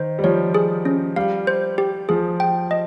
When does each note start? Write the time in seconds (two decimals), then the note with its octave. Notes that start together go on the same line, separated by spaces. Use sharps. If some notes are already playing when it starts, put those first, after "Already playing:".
Already playing: D#3 C5
0.19 G3
0.24 F3 C#5
0.54 G#4
0.85 C#4
1.16 G3 F5
1.47 C5
1.78 G4
2.09 F3 G#4
2.40 G5
2.71 D#5